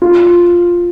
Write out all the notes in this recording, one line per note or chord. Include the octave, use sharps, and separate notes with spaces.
F4